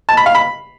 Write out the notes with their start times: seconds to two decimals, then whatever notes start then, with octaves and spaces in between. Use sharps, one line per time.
0.09 A5
0.17 B5
0.26 F5
0.35 B5